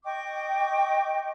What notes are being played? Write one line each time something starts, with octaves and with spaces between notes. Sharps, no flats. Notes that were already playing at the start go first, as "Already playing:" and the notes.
D#5 G5 C#6 D6